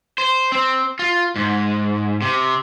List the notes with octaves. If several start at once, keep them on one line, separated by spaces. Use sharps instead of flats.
C5
C4
F4
G#2
C3